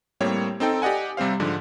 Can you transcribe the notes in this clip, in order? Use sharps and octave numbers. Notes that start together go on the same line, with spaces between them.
A2 G3 A#3 C4 C#5
C4 D#4 A4 G5
G4 D5 D#5 F#5 G#5
C3 G3 C4 C5 F5
G#2 D3 F3